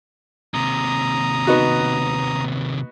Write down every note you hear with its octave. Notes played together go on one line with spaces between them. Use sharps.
D#2 C3 A#5 D#6
B3 D#4 F#4